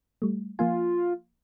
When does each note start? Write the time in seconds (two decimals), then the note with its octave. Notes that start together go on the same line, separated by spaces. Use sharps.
0.22 G3 A3
0.59 F3 A#3 F4 G#5